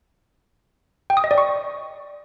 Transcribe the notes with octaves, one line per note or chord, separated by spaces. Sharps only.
G5
D#6
D#5
D5
C#6